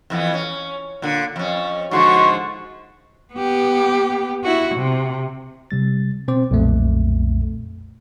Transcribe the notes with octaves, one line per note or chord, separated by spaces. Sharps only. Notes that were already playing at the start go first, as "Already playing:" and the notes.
F2 E3 B3
C#4
A#2 D3
F2 C#4
G#2 D3 F3 F#4 C6 C#6
B3 G4
E4 F#4
C3
C3 G3 A6
B2 C4 C5 D6
B1 F2 A#2 A3